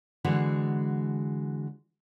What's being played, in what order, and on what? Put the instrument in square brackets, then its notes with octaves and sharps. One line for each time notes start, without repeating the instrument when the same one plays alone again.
[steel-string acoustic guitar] D3 E3 G#3 F#4